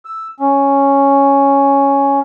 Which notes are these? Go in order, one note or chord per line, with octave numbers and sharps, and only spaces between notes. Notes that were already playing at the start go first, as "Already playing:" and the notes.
E6
C#4